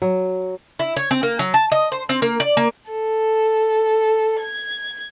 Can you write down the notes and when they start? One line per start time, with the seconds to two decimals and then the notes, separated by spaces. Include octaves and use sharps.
0.02 F#3
0.79 E4
0.96 C#5
1.11 C4
1.23 A#3
1.39 F#3
1.54 A5
1.72 D#5
1.92 C5
2.09 C4
2.22 A#3
2.40 D5
2.57 A#3
2.91 A4
4.40 G#6